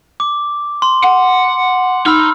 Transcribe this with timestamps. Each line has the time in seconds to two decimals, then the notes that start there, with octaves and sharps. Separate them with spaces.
0.20 D6
0.82 C6
1.04 F#5
2.06 D#4 B5 E6 F6